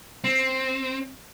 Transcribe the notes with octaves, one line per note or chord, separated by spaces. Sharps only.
C4